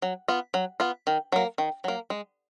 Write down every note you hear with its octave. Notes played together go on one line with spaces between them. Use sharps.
F#3
B3 F4
F#3
B3 F4
D#3
F#3 A#3
D#3
F#3 A#3
G#3